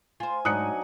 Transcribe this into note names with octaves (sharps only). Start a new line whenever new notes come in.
F4 C5 G#5
G#2 F#3 D4 D#4 D#6 F#6 C#7